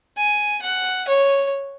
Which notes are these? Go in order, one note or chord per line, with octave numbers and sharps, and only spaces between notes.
G#5
F#5
C#5